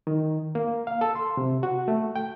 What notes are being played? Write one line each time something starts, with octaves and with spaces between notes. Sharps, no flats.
D#3
A#3
F5
A4
C6
C3
F#4
A3
G5